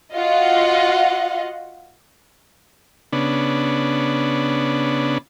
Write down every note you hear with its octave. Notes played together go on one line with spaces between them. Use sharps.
F4 F#4 D#5 F5 F#5
C#3 B3 D4